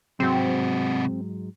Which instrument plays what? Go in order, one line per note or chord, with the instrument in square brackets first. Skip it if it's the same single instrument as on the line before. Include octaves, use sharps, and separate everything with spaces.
[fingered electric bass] G#2 F#3 G#3 [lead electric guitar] C3 F#4 [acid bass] C4